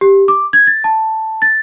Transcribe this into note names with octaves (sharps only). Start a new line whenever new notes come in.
G4
D6
G#6
A6
A5
A6